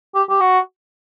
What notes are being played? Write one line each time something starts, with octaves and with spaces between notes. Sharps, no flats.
G4
G4
F#4